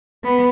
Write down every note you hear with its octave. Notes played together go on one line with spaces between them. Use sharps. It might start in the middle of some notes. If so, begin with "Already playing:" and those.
B3